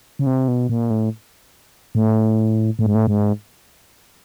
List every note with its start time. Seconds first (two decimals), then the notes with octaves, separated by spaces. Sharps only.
0.19 C#3
0.26 C3
0.48 B2
0.69 A#2
0.90 A2
1.95 A2
2.79 A2
2.86 G#2
2.95 A2
3.07 G#2